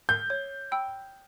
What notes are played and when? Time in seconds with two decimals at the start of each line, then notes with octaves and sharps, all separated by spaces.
0.09 G6
0.30 C#5
0.72 G5 B5 E6